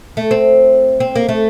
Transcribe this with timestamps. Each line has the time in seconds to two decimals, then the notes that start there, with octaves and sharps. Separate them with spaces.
0.17 A3
0.31 C4
1.00 C4
1.16 A#3
1.29 A3